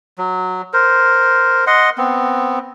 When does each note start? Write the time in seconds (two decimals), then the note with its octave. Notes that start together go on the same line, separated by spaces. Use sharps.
0.18 F#3
0.73 A#4 C5
1.67 D#5 F#5 C6
1.98 B3 C4